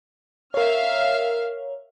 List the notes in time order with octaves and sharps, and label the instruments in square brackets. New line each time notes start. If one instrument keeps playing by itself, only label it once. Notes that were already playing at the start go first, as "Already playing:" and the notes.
[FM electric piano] A#4 C#5 [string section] E5 F5 F6